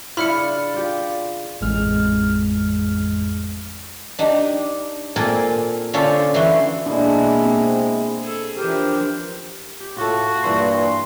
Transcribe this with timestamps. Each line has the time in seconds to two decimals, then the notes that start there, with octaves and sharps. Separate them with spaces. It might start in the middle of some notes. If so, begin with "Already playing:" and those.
0.17 C#3 D4 E4 D5 B5 F6 C#7
0.74 F4 G4
1.61 A1 F2 G#3 F6
4.19 D4 D#4 G4
5.16 A#2 C4 A4 A#4 G#5
5.93 D3 C#4 D4 F4 A4 C5
6.34 E3 E4 F#4 F#5 C6
6.86 B2 G#3 A#3 D4 E4
7.43 C4
8.20 G#4 A4
8.57 E3 F3 D4 G4 A#4 C5
9.80 G4
9.97 A2 F4 F#4 A4
10.44 G2 A#2 E3 C6